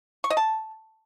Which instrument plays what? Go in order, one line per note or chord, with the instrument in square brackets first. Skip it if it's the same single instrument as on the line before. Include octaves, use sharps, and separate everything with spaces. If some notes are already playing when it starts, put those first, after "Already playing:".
[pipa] C#6
D#5
A5